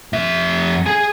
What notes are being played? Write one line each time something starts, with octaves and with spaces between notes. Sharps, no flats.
F2 E5
G#4 G#5